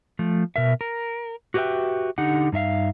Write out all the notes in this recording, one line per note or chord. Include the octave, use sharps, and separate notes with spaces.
F3 A3
B2 A#4 E5
A#4
F#4 G4 B4 C5 E5 G5
D3 D#4 G4 F#5
G2 D#4 E5 F5